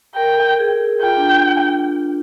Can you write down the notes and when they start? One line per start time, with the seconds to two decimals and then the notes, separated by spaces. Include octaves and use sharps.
0.15 A#4 G5
0.37 A4
0.59 G#4
1.02 F4 G5
1.17 D4